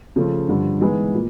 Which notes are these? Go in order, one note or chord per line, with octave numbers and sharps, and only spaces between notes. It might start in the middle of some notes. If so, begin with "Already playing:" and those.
C#3 F3 A3 C#4 F4
G2 D3 F3
E3 G#3 B3 D#4 G#4
A#2